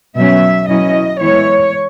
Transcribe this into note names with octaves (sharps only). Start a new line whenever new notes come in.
B2 F#3 C#4 E5
B2 F#3 C#4 E4 D#5
E3 G#3 B3 E4 C#5